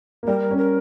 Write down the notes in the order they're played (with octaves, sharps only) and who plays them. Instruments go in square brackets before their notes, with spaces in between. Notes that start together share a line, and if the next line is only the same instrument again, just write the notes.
[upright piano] A#3
[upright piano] G3 [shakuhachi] A#4
[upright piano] C#4
[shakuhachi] A#4